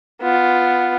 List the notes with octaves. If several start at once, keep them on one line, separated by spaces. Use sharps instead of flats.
B3 F4